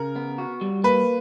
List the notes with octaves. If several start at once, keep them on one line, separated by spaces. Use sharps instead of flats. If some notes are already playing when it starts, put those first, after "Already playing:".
Already playing: C#3 A#4
B3
F#4
G3
A#3 B4